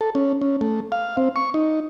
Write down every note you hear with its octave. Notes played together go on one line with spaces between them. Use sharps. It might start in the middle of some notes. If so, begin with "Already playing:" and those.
A4
C#4
C#4
A3
F5
C4
C#6
D#4